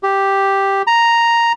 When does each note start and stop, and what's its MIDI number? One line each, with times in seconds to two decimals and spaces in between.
0.03 0.82 67
0.87 1.52 82